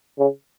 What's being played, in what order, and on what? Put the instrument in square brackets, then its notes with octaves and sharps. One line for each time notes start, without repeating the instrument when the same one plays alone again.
[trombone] C#3